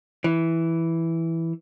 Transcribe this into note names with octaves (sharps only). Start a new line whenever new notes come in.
E3